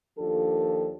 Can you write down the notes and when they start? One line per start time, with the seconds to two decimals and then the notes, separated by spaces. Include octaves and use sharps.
0.18 D#2 F3 D4 F4 G4 A4